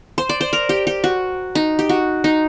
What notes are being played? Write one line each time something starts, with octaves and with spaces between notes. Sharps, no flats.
C5
D5
C5
A#4
G4
G4
F#4
D#4
G4
F#4
D#4